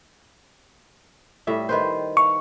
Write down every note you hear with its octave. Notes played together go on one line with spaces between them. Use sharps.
A2 G3 E5
D#3 B4 C5
F5 C#6